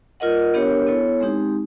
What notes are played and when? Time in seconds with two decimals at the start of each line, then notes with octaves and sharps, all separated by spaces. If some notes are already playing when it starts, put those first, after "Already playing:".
0.20 F4 A#4 D#5 F#5
0.54 B3 D4 G4 A#4 C#5
0.87 B3 E4 A4 C#5
1.20 G#3 C4 D#4 G4